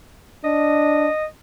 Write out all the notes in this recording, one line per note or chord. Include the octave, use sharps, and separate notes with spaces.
D4 D#5